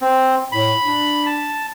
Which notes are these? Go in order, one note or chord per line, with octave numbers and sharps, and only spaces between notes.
C4
A2 B5
D4
A5